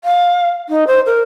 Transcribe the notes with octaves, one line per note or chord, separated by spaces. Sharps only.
F5
D#4
C5
A#4